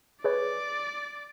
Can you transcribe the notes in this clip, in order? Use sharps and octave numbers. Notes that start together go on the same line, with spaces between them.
G#4 B4 C#5 D5